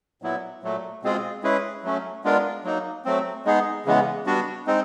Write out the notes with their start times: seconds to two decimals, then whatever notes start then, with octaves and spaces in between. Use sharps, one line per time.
0.22 A#2 F#3 B3 E4
0.63 A#2 F#3 A3
1.03 B2 G#3 C4 F4 G#4
1.43 G#3 C#4 E4 G#4 B4
1.84 F#3 A3 C#4
2.24 G#3 B3 D4 F4 A#4
2.64 F#3 A#3 D#4
3.05 F#3 A3 C4
3.45 G#3 B3 D#4 G#4
3.85 C#3 E3 G#3 B3
4.26 G3 B3 D4 F#4
4.67 G#3 C4 D#4